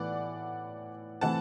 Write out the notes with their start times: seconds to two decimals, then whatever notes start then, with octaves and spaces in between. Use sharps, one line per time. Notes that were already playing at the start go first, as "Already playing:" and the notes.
Already playing: A2 E3 B3 D5 F#5
1.21 E3 A3 C4 F#5 A5